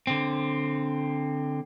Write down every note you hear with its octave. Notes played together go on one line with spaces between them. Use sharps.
D3 C4